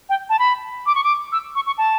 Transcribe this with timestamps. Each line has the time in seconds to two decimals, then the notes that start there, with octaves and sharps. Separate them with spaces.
0.09 G5
0.29 A5
0.39 B5
0.86 D6
0.95 C#6
1.04 D6
1.32 E6
1.55 C#6
1.67 C#6
1.78 A5